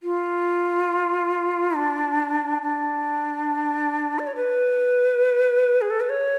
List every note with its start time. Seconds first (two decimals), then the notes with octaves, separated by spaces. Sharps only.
0.03 F4
1.76 D4
2.62 D4
4.19 D5
4.27 C#5
4.35 B4
5.81 G#4
5.90 A4
6.00 B4
6.09 C#5